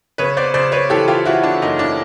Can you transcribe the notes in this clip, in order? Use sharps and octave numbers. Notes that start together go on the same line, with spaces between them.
C#3 B4 C#5
C5 D5
C#3 C5 D5
B4 C#5
E3 G4 A4
F4 G4
E3 E4 F#4
D4
F#1 D#4
D4 E4